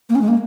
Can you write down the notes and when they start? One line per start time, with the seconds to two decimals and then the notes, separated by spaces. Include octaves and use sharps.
0.09 A#3
0.15 C#4
0.21 G#3
0.28 A#3